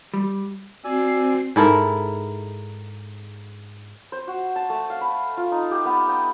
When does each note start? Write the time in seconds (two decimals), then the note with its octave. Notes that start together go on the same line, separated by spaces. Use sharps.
0.14 G3
0.84 C4 F#4 D5 G#5 E6 C7
1.56 G#2 E4 A4 A#4
4.12 C5
4.27 F#4
4.56 A5
4.70 A3
4.90 F5
5.01 B5
5.37 F4
5.52 D#4
5.71 G4
5.85 B3
6.09 G5